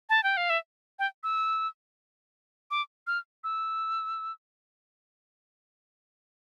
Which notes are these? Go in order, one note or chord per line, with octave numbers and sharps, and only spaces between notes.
A5
G5
F5
E5
G5
E6
D6
F6
E6